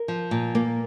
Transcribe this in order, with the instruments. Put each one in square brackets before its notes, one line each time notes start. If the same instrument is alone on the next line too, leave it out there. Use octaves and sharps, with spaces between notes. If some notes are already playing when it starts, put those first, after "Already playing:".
Already playing: [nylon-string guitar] A#4
F3
A#2
A#3